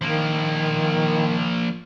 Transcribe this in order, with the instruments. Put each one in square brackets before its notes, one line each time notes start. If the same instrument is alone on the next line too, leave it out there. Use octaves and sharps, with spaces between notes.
[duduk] D#3 [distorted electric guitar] F3 A#3